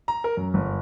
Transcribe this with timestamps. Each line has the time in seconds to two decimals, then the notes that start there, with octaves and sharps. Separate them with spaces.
0.08 A#5
0.24 A#4
0.37 F#2
0.54 G1